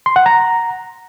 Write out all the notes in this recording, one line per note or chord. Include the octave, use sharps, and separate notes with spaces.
C6
F#5
A#5